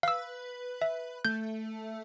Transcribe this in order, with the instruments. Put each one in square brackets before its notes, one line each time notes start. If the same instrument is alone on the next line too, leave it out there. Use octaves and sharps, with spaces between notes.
[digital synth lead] B4 [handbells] F5 E6
[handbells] E5
[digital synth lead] A3 [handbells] G6